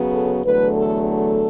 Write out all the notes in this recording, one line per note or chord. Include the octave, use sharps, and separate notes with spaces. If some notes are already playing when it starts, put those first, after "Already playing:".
Already playing: C#3 F#3 B3
A4
E2 D3 F#3 A3 B4
A4
A4